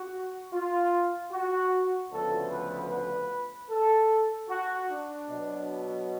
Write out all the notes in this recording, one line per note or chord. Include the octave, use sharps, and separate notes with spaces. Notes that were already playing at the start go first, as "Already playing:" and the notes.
Already playing: F#4
F4
F#4
D2 C#3 F3 B3 A4
B4
B4
A4
F#4
D4
B2 F#3 B3